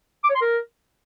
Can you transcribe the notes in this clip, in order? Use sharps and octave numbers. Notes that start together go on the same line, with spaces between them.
D6
C#5
C6
A#4